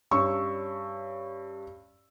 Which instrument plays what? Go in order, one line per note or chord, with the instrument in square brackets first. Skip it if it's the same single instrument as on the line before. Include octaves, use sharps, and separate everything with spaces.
[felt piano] G2 C#4 C#6 E6